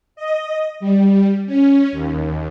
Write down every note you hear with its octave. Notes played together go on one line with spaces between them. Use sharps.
D#5
G3
C#4
D#2